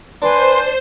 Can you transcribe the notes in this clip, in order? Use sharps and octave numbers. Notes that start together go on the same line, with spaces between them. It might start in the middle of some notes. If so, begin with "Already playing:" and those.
D4 B4 C5 G#5 C6